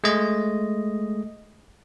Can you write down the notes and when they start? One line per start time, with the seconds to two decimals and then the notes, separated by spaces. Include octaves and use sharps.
0.04 G#3 A3 D#5